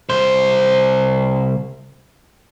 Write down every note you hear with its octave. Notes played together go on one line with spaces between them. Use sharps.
C2 C5